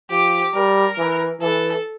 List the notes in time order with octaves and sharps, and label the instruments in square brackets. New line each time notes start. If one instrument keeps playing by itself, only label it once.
[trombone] F3 [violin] G4
[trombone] G3 [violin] A#4
[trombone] E3
[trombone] E3 [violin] A4